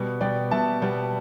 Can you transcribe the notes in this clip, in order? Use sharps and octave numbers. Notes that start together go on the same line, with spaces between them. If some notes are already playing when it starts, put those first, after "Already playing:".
Already playing: B2 G3 B3
B2 G3 B3 D5 G5
B2 G3 B3 E5 A5
B2 G3 B3